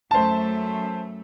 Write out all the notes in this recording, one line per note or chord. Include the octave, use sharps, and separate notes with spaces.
F#2 A3 C5 A5